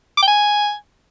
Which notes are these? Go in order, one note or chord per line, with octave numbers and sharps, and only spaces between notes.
D6
G5
G#5